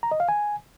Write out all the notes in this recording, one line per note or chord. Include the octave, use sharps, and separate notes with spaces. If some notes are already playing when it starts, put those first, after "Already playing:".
A#5
D#5
F5
G#5